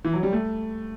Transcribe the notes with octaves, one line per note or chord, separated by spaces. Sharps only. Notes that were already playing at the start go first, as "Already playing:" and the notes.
E3
F#3
G3
A3